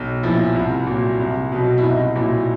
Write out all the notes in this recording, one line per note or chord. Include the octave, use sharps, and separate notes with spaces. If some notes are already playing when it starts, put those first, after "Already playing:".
Already playing: B1
A#2 F3 E4
C2
A#2 F#3
C2
B2 F#3
E4
C2 D#4
A#2 F#3 E4